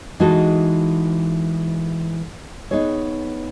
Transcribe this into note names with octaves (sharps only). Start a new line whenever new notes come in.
E3 G#3 D#4 F#4 A4
B3 D#4 G#4 C#5